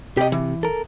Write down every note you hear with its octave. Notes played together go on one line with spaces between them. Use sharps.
C3 G4 D#5
E3
A4 A#4